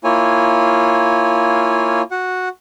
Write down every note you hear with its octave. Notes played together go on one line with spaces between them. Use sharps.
A#3 E4 F4 C#5 G#5
F#4 F#5